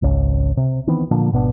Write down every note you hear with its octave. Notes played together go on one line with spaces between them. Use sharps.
G#1 C#2 C#4
C3
D#3 E3 B3 C4
A#2 D3 F3 A#3
G#1 B2 B3 D4